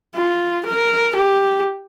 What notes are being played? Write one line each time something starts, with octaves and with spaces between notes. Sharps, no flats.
F4
A#4
G4